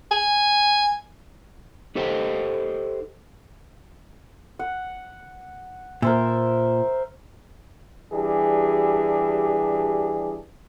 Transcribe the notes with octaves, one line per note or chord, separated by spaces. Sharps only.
G#5
D#4 G4 A4 C5 D#5 G5
F#5
A#2 A#4 C5 E5
E3 G3 D4 G4 G#4